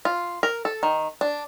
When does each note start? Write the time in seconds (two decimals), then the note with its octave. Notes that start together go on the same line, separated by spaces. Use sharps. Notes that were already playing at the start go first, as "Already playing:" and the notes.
0.05 F4
0.43 A#4
0.65 A4
0.83 D#3
1.21 D4